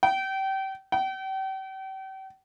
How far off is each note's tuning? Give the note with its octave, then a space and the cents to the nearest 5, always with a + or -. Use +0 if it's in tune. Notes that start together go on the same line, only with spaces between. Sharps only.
G5 -30
G5 -40